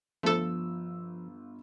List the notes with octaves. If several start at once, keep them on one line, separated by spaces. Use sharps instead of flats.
G1 F3 A3 F4 A4 E6